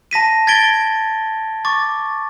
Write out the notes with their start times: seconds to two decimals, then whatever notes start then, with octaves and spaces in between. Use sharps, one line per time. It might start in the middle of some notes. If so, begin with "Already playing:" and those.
0.11 A5 A#6 B6 D#7
0.47 G#6 A6 B6 D7 G7
1.65 C#6 D6 A6